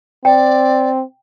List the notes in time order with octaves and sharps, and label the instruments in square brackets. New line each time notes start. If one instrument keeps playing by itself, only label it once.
[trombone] C4 [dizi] D5 [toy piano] G5